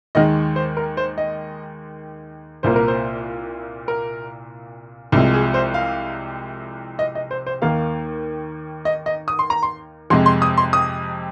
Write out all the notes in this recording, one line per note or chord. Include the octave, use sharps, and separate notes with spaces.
D#2 D#3 G#3 D#5
C5
A#4
C5
D#5
C2 A#2 A#3 C5
A#4
C5
A#4
C2 C3 F3 G#3
G#4
C5
F5
D#5
D#5
C5
C5
D#2 D#3 A#3 F5
D#5
D#5
D#6
C6
A#5
C6
F2 C3 G#3 C6
C6
D#6
C6
D#6